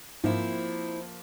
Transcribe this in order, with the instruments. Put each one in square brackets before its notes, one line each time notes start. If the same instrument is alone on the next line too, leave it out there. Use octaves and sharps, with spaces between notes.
[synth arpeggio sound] G#2 [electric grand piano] F3 A#3 [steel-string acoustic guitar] C4 E4